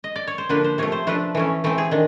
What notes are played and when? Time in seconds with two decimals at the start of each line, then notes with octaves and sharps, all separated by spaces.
0.04 D#5
0.16 D5
0.27 C#5
0.38 C5
0.49 D3 F3 A#3 D4 B4
0.64 C5
0.78 C3 F3 A3 C#5
0.92 C5
1.07 F3 A3 D4 B4
1.35 E3 A3 C#4
1.64 E3 A3 C4
1.78 G#4
1.91 D#3 D4